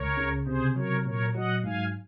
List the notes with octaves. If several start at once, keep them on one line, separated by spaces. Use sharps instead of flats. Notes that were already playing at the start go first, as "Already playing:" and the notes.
Already playing: C#2 A#4 C#5
C#3
C3 G#4 C5
F#3 A#4 C#5
A#2 A#4 C#5
F#3 D#5 F#5
G#2 F5 G#5